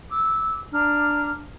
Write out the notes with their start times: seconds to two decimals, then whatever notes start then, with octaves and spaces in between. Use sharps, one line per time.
0.10 D6 E6
0.73 D4 A#5 F6